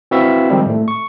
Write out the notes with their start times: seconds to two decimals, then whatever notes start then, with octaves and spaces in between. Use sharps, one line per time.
0.11 C4 E4 F#4 B4 E5 F5
0.50 D#3 F3 G3 G#3 C4
0.66 A2 A3
0.88 C#6